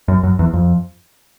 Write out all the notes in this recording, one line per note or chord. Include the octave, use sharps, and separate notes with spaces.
F#2
F#2
E2
F2